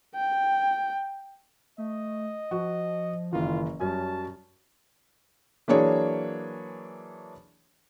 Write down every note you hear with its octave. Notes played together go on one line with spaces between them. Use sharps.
G5
A3 D#5
F3 F#4
F#1 D#3 E3 F4
F#2 G3 C#4 F#4 A5
E3 F#3 A#3 D4 G#4 C#5